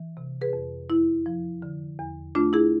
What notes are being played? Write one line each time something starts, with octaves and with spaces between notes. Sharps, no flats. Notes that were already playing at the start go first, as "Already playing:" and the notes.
Already playing: E3
C3
G#4 B4
F2
E2 E4
F3
D3
E2
A3 D4 F4
E4 G#4